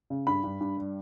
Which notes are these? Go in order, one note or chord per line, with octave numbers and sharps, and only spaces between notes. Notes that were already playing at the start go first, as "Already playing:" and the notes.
C#3
G2 B5
G2
G2
G3